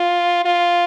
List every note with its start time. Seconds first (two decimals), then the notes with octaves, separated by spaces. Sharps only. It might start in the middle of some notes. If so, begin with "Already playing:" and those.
Already playing: F4
0.45 F4